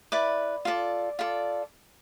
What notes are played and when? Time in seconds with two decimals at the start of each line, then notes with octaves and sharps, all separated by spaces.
0.12 E4 B4 D5 D6
0.65 F4 A4 D5
1.19 F4 A4 D5